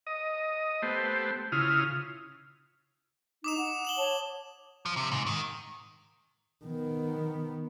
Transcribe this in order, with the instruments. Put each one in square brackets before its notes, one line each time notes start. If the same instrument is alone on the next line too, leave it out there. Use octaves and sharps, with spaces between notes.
[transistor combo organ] D#5
A3 B3 G4 C5
C#3 E4 F4 D#6 F6
[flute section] D#4 [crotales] D6 D#6 E7
[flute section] F#5
[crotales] E7 F#7 G7
[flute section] C#5 A5
[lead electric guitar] F3
C3
G#2
D#3
[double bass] D#3 B3